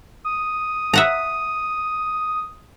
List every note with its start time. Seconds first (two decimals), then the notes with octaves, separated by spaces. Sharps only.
0.24 D#6
0.93 E5 F#5 A#5